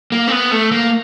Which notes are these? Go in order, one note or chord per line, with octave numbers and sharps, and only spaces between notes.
A#3
C4
B3
A3
A#3